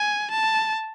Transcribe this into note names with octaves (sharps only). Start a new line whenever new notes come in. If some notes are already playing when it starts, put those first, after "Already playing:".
Already playing: G#5
A5